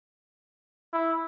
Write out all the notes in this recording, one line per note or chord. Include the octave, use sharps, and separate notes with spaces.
E4